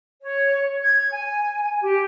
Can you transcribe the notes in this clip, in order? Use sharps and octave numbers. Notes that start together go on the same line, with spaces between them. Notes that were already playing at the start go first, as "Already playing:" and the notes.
C#5
G#6
G#5
G4